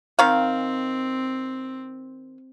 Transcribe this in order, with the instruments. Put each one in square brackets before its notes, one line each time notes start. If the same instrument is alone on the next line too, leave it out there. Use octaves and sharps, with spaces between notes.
[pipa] D#3 F5 [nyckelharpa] C4